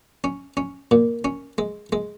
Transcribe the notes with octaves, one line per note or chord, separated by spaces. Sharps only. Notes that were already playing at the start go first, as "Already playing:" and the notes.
C#4
C#4
A#2
C#4
G#3
G#3